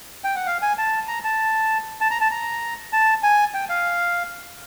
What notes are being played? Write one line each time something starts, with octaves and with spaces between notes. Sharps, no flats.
G5
F#5
F5
G#5
A5
A#5
A5
A5
A#5
A5
A#5
A5
G#5
G5
F5